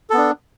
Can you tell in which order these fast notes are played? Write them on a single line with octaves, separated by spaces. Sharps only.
A4 B3 D4